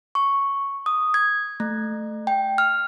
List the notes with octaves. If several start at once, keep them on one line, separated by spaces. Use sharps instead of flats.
C#6
D#6
G#6
A3
G5
F6